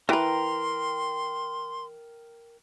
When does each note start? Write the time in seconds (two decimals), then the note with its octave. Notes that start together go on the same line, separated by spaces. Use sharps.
0.09 E3 A#4 B4 G5 A#5 C6